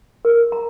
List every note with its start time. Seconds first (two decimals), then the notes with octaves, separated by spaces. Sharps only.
0.25 A#4
0.52 A#5